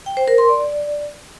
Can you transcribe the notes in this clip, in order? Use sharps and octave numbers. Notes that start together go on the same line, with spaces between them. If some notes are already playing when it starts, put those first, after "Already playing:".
G5
C5
A#4
C6
D5